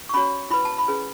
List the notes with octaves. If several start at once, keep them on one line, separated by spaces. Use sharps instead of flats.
C#6
C#4 F#4 C#5 B5
E4 B4 B5
A5
B5
C#4 G#4 B4